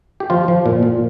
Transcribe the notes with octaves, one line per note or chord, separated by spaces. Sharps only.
G4
F3 F4
F3
A#2
A#2